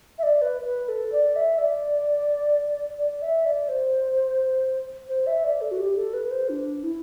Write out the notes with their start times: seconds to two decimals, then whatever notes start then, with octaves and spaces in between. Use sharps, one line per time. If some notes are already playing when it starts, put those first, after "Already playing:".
0.19 E5
0.23 D5
0.42 B4
0.65 B4
0.89 A4
1.12 D5
1.36 E5
1.59 D5
2.99 D5
3.22 E5
3.46 D5
3.69 C5
5.09 C5
5.27 E5
5.44 D5
5.61 A4
5.71 F#4
5.79 G4
5.97 A4
6.14 B4
6.31 C5
6.49 D4
6.83 E4